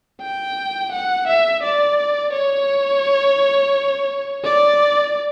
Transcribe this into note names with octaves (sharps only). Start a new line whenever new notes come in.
G5
F#5
E5
D5
C#5
D5